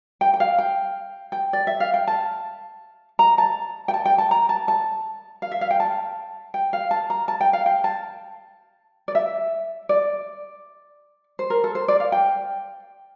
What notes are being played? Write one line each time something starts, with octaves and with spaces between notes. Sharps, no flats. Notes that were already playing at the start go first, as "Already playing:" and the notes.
G5
G5
F5
G5
G5
D5
E5
F5
G5
A5
A#5
A5
G5
A5
G5
A5
A#5
A5
A5
F5
E5
F5
G5
A5
G5
F5
A5
A#5
A5
G5
F5
G5
A5
D5
E5
D5
C5
A#4
A4
C5
D5
F5
G5